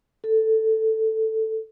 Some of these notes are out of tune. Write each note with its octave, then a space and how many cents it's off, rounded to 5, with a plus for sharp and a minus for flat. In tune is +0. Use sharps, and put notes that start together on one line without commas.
A4 +5